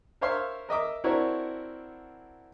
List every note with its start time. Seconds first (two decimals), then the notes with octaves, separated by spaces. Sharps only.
0.21 A#4 C5 C#5 E5 F5 C6
0.69 A#4 D#5 E5 D6
1.04 C4 D4 E4 F#4 A#4 C#5